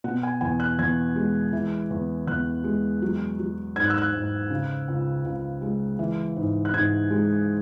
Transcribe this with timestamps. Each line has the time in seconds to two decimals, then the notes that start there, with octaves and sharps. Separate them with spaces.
0.04 B2 F#5
0.23 G#5
0.41 E2 G#5
0.60 F#6
0.79 E2 G#6
1.16 G#3
1.53 E3
1.91 E2
2.27 E2 F#6
2.64 G#3
3.02 F#3
3.39 F#3
3.76 G#2 G#6
3.84 F#6
3.90 E6
3.98 F#6
4.13 G#2
4.50 C#3
4.88 C#2
5.25 C#2
5.62 G#3
5.99 E3
6.37 G#2
6.65 F#6
6.74 G#2 G#6
7.11 G#3